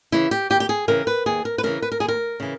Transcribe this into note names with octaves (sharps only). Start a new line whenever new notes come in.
C#3 E3 E4
G4
D#2 G4
G4
G#4
C#3 E3 A#4
B4
D#2 G#4
A#4
B4
C#3 E3 A#4
B4
A#4
D#2 G#4
A#4
C#3 E3